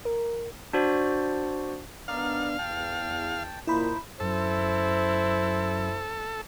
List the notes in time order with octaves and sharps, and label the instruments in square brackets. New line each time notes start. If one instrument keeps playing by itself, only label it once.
[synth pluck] A#4
[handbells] D4 F#4 C5 D5
[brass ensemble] B3 D4 [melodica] D#4 A#4 D5 [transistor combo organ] F5
[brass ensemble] E2 [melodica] G5 A5
[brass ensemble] A#2 [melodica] D#4 C5 [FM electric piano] E4 B5
[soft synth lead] F#2 [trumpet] E4 [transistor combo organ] A4 [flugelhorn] C5